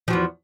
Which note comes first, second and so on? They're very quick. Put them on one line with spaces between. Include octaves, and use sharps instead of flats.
F3 F#3 E2